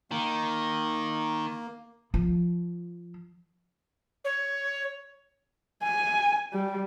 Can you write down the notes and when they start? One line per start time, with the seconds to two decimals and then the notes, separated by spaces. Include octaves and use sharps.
0.12 D#3 A#3
2.14 F3
4.24 C#5
5.83 G#5
6.53 G3